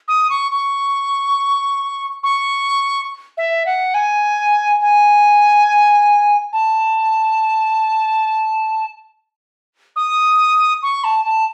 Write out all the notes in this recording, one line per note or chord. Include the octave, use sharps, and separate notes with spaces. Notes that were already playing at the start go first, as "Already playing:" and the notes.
D#6
C#6
C#6
C#6
E5
F#5
G#5
G#5
A5
D#6
C#6
A5
A5